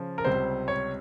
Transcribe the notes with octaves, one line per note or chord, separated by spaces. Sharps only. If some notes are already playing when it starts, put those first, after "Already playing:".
Already playing: C#3 F3
A#4
C#2 C3 G3 C5
C#5